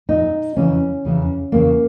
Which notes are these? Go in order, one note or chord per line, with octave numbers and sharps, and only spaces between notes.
A#2 D#4
E2 C#3 E3 C#4
E2 C#3 E3
E2 C#3 E3 A#3